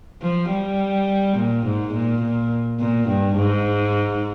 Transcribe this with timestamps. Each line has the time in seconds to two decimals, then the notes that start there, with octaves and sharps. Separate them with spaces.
0.22 F3
0.51 G3
1.37 A#2
1.66 G#2
1.94 A#2
2.22 A#2
2.80 A#2
3.08 G2
3.36 G#2